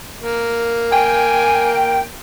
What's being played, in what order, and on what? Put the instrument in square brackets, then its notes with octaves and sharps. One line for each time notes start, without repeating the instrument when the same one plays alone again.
[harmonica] A#3
[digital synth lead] G5 [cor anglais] G#5